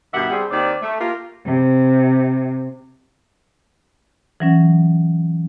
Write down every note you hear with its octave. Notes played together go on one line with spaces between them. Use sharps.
G2 B2 D#3 D5 E5 F#5
G3 C4 D4 G#4
D#2 D#3 C4 D5
A3
A#3 F4 G4 A#4
C3
E3 F#3 C#4